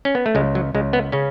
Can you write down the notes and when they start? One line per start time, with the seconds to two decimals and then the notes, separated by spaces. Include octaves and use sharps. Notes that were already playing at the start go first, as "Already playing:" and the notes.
0.05 C#4
0.15 B3
0.26 A3
0.35 C#2 G#3
0.55 F#3
0.75 C#2 G#3
0.93 B3
1.12 C#3 C#4